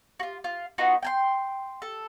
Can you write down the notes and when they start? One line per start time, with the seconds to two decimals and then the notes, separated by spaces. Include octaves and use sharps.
0.20 F4 F#4
0.44 F4
0.78 B3 D#4 F4 F#4
1.03 G5 G#5 C6
1.82 A4